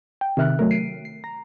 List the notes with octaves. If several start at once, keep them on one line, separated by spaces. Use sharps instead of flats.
G5
C3 D#3 E5 F6 F#6
F#3 A3 A#4
C7 D7 D#7
C7
A#5